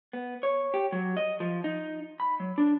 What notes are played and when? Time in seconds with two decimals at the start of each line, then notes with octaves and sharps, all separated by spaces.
0.13 B3
0.43 C#5
0.74 G4
0.92 F#3
1.17 D#5
1.40 F3
1.64 D#4
2.20 B5
2.40 F#3
2.58 D4